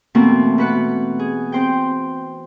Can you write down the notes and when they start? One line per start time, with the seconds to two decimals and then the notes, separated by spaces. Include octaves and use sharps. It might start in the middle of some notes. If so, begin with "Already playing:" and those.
0.15 B2 E3 A3 A#3 C4
0.58 B2 B4 F#5
1.19 G#4
1.52 C4 C5 G5